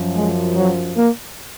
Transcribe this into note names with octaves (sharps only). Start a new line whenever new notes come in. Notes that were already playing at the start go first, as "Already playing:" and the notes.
Already playing: F#2 F3
G#3
F#3
A#3